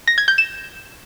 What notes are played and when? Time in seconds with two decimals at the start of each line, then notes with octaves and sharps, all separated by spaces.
0.07 A#6
0.18 G#6
0.28 G6
0.38 E7